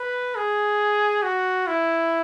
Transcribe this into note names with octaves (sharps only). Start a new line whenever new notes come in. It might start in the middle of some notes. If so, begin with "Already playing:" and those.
Already playing: B4
G#4
F#4
E4